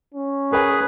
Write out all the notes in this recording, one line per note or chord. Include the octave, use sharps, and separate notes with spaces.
C#4
G#4 A#4 B4 G#5